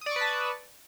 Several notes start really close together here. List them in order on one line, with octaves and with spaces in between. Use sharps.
D#6 D5 C#6 B4 A5